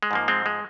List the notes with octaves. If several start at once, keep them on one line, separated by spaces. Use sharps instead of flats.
G#3
G#2 F3 A#3
G#3 C4
G#3